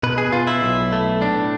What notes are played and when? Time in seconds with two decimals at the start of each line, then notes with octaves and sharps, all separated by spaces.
0.03 B2 B4
0.18 G#4
0.32 B2 F4
0.47 E4
0.63 B1
0.92 A3
1.21 A2 D4